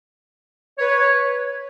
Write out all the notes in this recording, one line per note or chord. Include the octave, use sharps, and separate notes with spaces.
B4 C#5